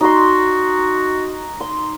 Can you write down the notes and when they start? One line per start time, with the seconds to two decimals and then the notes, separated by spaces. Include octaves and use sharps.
0.01 D#4 F#4 C6
1.60 C6